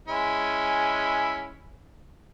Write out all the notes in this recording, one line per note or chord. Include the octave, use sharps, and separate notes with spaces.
G#3 C#4 E4